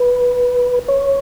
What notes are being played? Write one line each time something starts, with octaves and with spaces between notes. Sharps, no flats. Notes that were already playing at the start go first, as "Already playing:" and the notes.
Already playing: B4
C#5